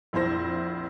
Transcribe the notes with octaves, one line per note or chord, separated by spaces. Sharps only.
A#1 F2 E4 C5 A#6